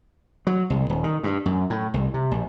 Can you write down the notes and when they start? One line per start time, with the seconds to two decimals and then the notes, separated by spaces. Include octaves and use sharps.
0.47 F#3
0.70 C2
0.90 D#1
1.04 D#3
1.24 G2
1.46 F#2
1.70 A2
1.94 C2
2.14 C3
2.31 A#1